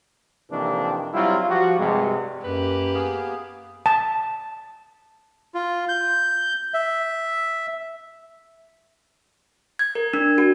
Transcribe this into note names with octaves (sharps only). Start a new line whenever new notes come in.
F2 C3 D#3 E3 A#3 D4
F#3 G3 C4 E4 F4
F3 F#4 G4
G2 C3 G#3
F#2 A#3 G4 B4
B3 G#4 F5
A5
F4
G6
E5
G#6
A#4
D4
F#4